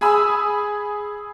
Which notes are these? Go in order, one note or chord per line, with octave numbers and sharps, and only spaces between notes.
G#4 G#5 B5 D#6 E6